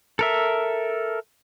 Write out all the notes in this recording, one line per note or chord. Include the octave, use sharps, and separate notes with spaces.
A4 A#4 E5